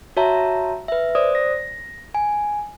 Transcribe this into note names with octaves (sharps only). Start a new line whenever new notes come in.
F#4 C#5 E5 A5 A#5
B4 E5
C5 D5 D#6
A#6
G#5